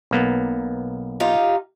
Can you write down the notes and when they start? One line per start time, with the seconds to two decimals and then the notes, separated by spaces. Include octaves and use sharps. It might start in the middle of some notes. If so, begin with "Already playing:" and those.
0.11 B1 A#3 B3
1.20 D#4 F4 G4